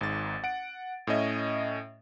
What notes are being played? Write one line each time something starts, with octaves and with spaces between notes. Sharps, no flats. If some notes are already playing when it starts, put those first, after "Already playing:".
G#1 G#2 A6
F#5 D7
A2 C#4 D#5 E5